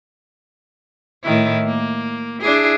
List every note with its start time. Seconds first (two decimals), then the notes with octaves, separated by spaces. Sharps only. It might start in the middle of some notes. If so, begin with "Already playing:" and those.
1.23 A2 D#3 E4
1.65 A#3
2.41 D4 E4 G#4